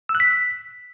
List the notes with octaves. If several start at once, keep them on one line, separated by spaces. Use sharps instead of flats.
E6
F#6
B6